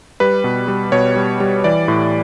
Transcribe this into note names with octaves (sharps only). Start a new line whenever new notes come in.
G3 B4
B2
G3
B2 C#5
G3
G3
E3 D5
A2